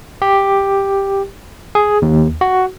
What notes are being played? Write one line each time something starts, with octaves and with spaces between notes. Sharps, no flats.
G4
G#4
D#2
F#4